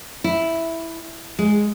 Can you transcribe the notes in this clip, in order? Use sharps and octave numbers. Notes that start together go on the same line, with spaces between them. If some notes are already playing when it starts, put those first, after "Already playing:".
E4
G#3